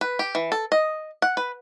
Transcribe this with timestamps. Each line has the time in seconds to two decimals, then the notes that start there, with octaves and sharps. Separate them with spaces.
0.01 B4
0.19 G4
0.35 E3
0.52 A4
0.72 D#5
1.22 F#5
1.37 B4